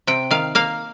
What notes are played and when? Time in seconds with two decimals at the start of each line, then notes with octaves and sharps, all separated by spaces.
0.07 C3 G5
0.31 D#3 F5
0.55 A#3 F5